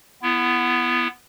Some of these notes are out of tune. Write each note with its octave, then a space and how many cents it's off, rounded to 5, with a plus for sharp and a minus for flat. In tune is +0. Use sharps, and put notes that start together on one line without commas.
B3 +0 E4 +35